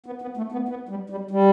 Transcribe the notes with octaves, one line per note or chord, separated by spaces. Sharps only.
B3
B3
A3
B3
B3
G3
G3
G3